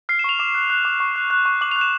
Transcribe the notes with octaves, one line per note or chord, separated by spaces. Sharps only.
F6 C7
E7
C#6 F7
D6 E7
F#6
F#6
D6
C#6
F#6
F#6
C#6
D6 F#7
F7
F#6
E7